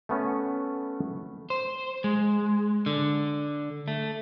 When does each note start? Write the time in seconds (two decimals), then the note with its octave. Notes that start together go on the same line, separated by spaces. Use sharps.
0.09 A3 B3 C#4
1.50 C5
2.04 G#3
2.86 D3
3.88 A3